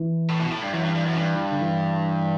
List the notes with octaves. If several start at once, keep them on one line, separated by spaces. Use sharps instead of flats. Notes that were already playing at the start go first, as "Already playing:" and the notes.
Already playing: E3
A2
B2
A2
G2
F#2 E3
G2
G2
F#2
A2
G2
D3
E3